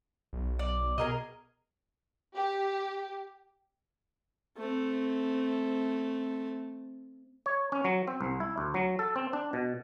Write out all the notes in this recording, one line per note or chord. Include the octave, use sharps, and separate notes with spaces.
B1
D5
B2 G#4 A#4 D#5
G4
A3 C4
C#5
C#4
F#3
C4
C2
E4
D2
F#3
A4
C4
D4
B2